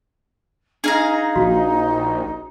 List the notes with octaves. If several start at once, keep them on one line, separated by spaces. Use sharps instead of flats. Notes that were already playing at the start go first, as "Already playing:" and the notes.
D4 D#4 G#4 F5 A#5
A#1 F#4